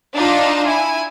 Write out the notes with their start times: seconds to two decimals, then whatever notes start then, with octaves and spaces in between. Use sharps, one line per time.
0.16 D4 D#4 F4 A5
0.65 E4 G#5